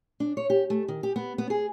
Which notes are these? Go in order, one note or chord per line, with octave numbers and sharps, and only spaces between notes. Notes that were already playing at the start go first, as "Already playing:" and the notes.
D4
C#5
G4
A3
D#3
G4
B3
B3
G#4